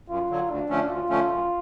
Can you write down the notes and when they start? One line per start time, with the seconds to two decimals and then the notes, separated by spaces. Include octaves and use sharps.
0.09 F#2 F4
0.30 D3 F#3
0.49 D2 D4
0.69 D3 F3 A3 C#4
0.89 D2 F4
1.10 D3 F3 A3 C#4
1.30 F#2